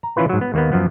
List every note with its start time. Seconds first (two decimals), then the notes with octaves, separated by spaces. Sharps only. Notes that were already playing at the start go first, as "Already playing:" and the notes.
0.03 A#5
0.17 E3 C#4 E4 F4 B4
0.29 G#2 F#3
0.41 B3
0.54 D#2 A#3 B3
0.72 F#2 F3 B3